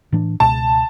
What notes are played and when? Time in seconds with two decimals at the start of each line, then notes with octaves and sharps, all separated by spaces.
0.12 A2 E3 D4
0.40 C#2 B2 A5